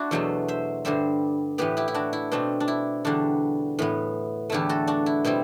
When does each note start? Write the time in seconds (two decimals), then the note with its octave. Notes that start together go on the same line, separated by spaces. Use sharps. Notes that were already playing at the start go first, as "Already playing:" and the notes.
Already playing: D4 E4 F#4
0.11 E2 B2 F#3 A3 C5 E5
0.48 C5 E5
0.85 G2 D3 G3 C5 E5
1.58 A2 E3 B3 G4 B4
1.77 E4 G4
1.88 E4
1.94 D4 F#4
2.13 E4
2.32 B2 A3 C4 D4
2.60 D4
2.68 E4
3.05 E2 D3 G3 D4 F#4
3.79 A2 E3 B3
4.50 E2 D3 A3 E4 G4
4.69 F#4 A4
4.87 D4 F#4
5.06 E4
5.25 B2 G3 C4 E4